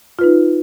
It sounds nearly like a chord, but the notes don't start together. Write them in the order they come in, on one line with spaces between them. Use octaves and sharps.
F4 B4 D#4